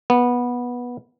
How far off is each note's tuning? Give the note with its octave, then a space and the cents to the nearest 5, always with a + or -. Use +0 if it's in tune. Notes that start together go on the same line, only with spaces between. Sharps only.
B3 -15